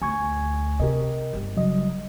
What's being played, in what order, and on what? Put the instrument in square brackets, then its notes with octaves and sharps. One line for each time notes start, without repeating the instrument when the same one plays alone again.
[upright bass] D2 [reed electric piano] G#5 C#6 G#6
[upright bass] C3 [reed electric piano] G4 A#4 D#5
[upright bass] G1 G3
[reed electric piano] C#3 F#3 D#5